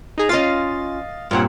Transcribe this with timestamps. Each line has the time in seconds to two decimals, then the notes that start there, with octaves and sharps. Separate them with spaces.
0.18 D#4 G#4 A#5
0.29 C#4 F4 D#5 F5 A6
1.31 G2 A#2 C4 F4 C#5 F#5